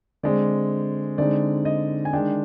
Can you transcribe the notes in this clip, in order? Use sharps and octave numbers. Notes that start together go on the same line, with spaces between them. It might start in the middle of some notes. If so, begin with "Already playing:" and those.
D3 G#3 C4 D5
D3 G#3 C4 D#4 D5
D#5
G#5
D#3 G#3 D4 G5